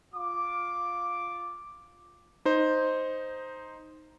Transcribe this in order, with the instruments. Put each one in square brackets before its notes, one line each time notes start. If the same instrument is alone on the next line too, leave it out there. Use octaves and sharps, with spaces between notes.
[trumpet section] F4 D6
[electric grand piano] D#4 C5